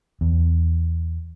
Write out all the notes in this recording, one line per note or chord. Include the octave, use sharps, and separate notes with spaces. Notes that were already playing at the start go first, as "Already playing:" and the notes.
E2